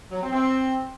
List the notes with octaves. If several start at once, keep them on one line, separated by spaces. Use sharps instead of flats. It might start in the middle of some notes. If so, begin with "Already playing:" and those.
F#3
C4
C4